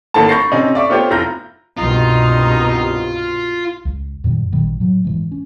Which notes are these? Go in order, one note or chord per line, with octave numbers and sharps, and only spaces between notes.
A1 D#3 A#3 A4 A5
B5 C#6 G6 A6 A#6 C7
C3 C#4 D#4
D5 E5 C#6 D6
A3 B3 F4 G4 C5 C#5
F1 E4 F4 A#5 G6 A#6
C2 G2 B2 D#4 F4
C#2
F#2 A#2 D#3 G3
A1 A#2 D#3 G3
A2 F#3
G#2 E3 G#3
C#4